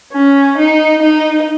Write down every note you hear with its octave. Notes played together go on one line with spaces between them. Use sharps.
C#4
D#4
D#4